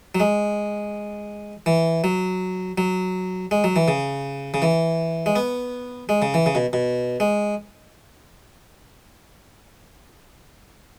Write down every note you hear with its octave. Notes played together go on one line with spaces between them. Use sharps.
F#3
G#3
E3
F#3
F#3
G#3
F#3
E3
C#3
C#3
E3
G#3
B3
G#3
C#3
E3
C#3
B2
B2
G#3